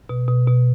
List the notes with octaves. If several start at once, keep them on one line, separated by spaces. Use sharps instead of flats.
B2
B2
B2